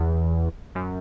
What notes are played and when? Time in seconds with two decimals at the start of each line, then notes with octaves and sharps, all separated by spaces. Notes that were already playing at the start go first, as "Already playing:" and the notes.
Already playing: E2
0.75 F#2